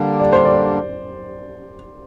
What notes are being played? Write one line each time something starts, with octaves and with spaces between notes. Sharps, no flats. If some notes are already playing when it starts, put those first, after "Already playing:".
Already playing: D3 G3 A#3 D4
D5
C5
D5